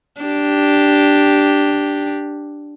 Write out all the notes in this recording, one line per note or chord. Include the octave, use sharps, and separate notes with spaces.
D4 G4